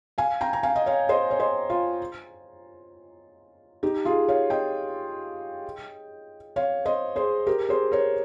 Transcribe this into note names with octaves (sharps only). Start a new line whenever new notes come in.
F5 G#5
G5 A#5
A#5
F5 G#5
D#5
C#5 F5
C5 D#5
C#5
C5 D#5
F4
D#4 G4
F4 G#4
C#5 F5
D#5 G5
C#5 F5
C5 D#5
G#4 C5
G4 A#4
G#4 C5
A#4 C#5